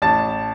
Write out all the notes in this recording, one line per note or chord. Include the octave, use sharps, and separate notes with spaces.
A1 A5 A6